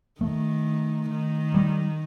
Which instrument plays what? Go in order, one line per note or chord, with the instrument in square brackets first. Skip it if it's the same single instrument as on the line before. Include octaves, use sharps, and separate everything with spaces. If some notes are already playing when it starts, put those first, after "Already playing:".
[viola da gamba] D#3 [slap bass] A3
[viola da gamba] D#3
[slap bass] G3